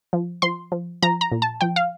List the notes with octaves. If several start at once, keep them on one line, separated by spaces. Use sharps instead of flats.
F3
F3 C6
F3
F3 A#5
A#5
A#2
A5
F3 G5
F5